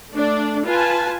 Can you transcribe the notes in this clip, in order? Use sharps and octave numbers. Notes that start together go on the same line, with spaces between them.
A3 D4 D5
F4 B4 G#5 A5